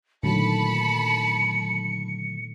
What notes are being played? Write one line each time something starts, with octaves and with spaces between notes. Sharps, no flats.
A#2 D3 D#3 F#3 A3 A5 B5 C#7